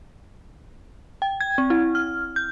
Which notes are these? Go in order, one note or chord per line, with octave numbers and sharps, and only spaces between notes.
G5
G#6
C4
E4
F6
G6